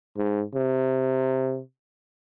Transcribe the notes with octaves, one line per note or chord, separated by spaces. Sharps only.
G#2
C3